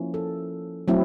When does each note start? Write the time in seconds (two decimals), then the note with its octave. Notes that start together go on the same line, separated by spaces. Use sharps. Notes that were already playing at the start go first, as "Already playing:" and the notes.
Already playing: F3 A#3 C#4 E4
0.14 A4
0.88 F#3 A3 C4 E4